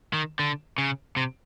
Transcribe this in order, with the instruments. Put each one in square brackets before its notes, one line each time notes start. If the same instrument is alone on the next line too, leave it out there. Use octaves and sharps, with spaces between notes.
[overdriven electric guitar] D#3
D3
C#3
C3